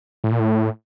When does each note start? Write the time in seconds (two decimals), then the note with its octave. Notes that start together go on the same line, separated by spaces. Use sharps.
0.24 A2
0.32 A#2
0.40 A2